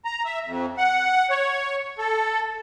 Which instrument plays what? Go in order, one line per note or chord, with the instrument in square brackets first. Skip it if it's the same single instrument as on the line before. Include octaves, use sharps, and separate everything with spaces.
[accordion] A#5
E5
F2
F#5
C#5
A4